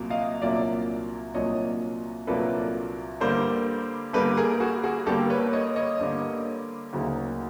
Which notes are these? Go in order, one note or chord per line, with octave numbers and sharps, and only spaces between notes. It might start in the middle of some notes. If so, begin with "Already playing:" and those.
Already playing: C2 A#2 F#3 A#3
D#5 F5
C2 A#2 F#3 A#3 D4 D5 E5
C2 A#2 F#3 A#3 D4 C#5 D#5
C2 A#2 F#3 A#3 D4 A4 B4
G2 D3 G3 A#3 A#4 C5
G2 D3 G3 A#3 A4 B4
G#4 A#4
F#4 G#4
F#4 G#4
G2 D3 G3 A#3 G4 A4
B4 C#5
C#5 D#5
C#5 D#5
G2 D3 G3 A#3
D2 C#3 F#3 A#3 D#4